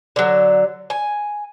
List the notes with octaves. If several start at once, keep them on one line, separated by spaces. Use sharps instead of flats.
D3 F#3
G#5